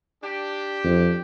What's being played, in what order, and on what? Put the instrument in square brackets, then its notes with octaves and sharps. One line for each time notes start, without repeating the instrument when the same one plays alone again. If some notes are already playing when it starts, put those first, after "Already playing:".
[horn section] D4 G4
[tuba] F2